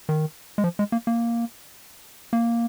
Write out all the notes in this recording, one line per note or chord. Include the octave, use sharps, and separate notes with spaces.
D#3
G#3
F3
G#3
A#3
A#3
A#3